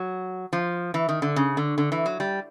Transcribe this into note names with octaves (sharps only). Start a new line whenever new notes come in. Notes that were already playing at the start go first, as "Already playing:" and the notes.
Already playing: F#3
F3
E3
D#3
D3
C#3
D3
D3
E3
F#3
G3